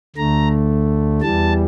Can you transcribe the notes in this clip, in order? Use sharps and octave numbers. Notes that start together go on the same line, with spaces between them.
D2 D3 A3 A#5
E2 E3 G3 A5